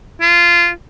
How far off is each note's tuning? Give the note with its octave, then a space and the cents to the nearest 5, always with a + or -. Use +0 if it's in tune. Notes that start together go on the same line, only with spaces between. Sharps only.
F4 -15